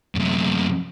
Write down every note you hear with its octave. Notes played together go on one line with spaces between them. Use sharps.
F#2 C3